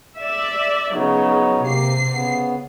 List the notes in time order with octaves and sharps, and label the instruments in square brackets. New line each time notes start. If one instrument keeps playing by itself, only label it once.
[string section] D5 E5
[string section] C#3 F#3 [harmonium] B3 D#4 C#5
[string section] C3 C7 [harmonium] A#3 G4
[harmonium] C#3 B3